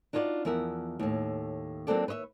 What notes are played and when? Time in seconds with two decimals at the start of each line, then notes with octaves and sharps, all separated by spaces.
0.13 D4 D#4 F4 F#4 C#5 D5
0.45 E2 F3 A#4 E5 F#5
1.00 D#2 A2
1.87 F#3 A#3 C4 D4 A4 D5
2.08 B4 C#5 D#5 E5